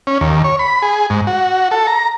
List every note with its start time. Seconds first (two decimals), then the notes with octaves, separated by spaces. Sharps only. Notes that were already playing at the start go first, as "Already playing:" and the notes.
0.07 C#4
0.21 D#2
0.44 C#5
0.59 B5
0.82 G#4
1.10 G#2
1.27 F#4
1.71 A4
1.87 A#5